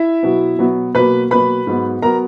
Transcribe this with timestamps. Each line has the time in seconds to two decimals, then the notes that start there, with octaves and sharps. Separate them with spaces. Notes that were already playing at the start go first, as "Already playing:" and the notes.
Already playing: E4 E5
0.23 B2 F#3 B3
0.59 B2 F#3 B3
0.95 B2 F#3 A#3 B4 B5
1.30 B2 F#3 A#3 B4 B5
1.67 G#2 F#3 B3
2.02 F#3 B3 A#4 A#5